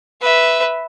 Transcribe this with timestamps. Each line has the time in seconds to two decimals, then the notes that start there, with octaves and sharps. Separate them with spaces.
0.22 B4 E5